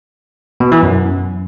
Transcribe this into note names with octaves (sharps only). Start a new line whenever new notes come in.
B2
E3
F#2